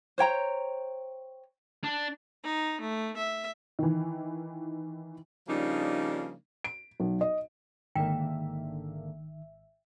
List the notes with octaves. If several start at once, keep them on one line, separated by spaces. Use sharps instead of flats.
C5 C#5 G5 A#5
D4
D#4
A3
E5
D#3 E3
C#3 F3 G3 A#3 D4 D#4
D7
B1
D#5
G#1 G#2 D3 D#3 A#3 E5 G5